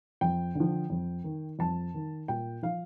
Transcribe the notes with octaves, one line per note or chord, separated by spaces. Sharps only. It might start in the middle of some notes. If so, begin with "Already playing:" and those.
F2 G5
D3 F3
F2
D#3
F2 A5
D#3
A#2 G5
F3 F5